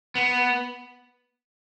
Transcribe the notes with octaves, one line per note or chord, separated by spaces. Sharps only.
B3